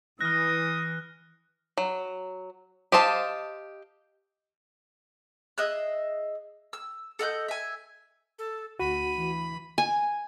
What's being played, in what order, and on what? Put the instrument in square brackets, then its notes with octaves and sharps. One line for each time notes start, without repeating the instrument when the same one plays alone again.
[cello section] E3 [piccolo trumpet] D#6 [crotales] F6 F#6 [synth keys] A#6
[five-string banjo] F#3
G4 C5 D#5 F5 A5
[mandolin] G#4 D#5 E5 F#6
E6
A4 D#5 F#5 G6
E5 G#5
[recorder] A4
[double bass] D2 [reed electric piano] F#4 [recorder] B5 [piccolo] D#7
[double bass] E3
[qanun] G#5